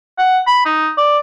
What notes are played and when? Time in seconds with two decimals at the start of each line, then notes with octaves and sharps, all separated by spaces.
0.18 F#5
0.47 B5
0.66 D#4
0.98 D5